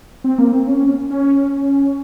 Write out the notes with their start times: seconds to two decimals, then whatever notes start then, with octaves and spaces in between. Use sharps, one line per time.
0.24 C4
0.38 A#3
0.53 C4
0.67 C#4
1.10 C#4